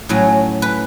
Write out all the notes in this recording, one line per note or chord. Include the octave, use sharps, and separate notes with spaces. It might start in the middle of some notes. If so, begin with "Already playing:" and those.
Already playing: A3
A2 F#3 C#4
B4